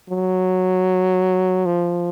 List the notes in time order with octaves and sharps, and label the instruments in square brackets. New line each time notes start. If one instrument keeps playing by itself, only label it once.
[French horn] F#3
F3